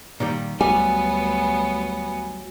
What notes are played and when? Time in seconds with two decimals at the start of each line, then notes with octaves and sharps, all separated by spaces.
0.20 A#2 D#3 G3
0.61 D2 F#3 G3 B3 G#5